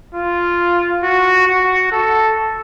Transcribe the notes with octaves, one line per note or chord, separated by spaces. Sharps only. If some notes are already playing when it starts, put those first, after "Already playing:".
F4
F#4
F#4
A4